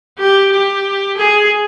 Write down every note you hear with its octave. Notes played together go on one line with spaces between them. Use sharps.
G4
G4
G#4